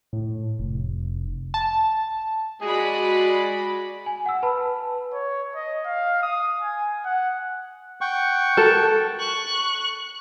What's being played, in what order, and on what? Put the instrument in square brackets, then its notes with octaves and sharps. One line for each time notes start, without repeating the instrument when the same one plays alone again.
[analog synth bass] A2
F1
[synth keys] A5
[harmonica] G#3 G#4 [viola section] F#4 D5 B5
[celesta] G#5
F#5 E6
B4 A5 B5
[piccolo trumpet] C#5
D#5
F5
D#6
G#5
F#5
[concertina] F#5 G5 C#6
[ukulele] A4 A#4 A5
[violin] C#6 F#6